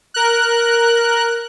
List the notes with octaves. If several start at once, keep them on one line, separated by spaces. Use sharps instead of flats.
A#4 F#6